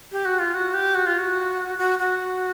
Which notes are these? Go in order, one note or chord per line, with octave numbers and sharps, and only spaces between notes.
G4
F#4
F4
F#4
G4
F#4
F4
F#4
F#4
F#4